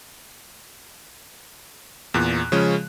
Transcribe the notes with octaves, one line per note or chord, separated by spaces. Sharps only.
E2 A#2 F#6
C#3 F3 G#3 C#4